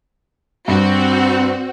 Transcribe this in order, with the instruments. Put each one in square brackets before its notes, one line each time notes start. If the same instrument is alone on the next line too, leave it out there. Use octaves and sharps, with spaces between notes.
[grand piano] G2 [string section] C4 F#4